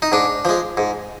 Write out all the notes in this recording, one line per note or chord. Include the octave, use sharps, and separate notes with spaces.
D#4
G#2 D4
F3 G#3
G#2